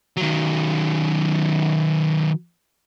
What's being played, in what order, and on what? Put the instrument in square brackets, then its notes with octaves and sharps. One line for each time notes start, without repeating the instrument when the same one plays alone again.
[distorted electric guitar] D#3 F#3